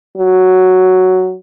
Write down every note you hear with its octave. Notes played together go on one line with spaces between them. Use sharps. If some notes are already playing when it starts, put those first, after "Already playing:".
F#3